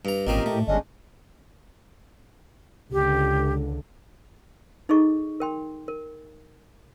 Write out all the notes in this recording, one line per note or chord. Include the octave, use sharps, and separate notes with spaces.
G2 A#5
G#1 A#2 C4 C#4 G4 A#4 D#5
A2 A3
G1 G#3 C#4 D4 D#5
C#2 D3 G4
D#4 G#4 A4 D#5 C#6
A#4 G5 C6
A#4